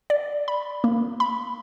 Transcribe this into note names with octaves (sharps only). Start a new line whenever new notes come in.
D5
B5
A#3
B5